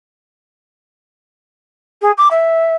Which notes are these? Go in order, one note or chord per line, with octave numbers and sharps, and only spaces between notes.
G#4
D6
E5